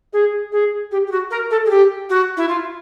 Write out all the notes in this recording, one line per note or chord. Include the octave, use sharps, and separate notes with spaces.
G#4
G#4
G4
G4
F#4
A#4
A4
G#4
G4
F#4
E4
F4